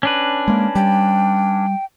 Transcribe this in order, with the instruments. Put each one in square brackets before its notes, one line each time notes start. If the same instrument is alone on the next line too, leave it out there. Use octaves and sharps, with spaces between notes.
[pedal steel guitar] C#4 D4 B4
[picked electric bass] G#3 A#3
[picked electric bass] G3 [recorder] G5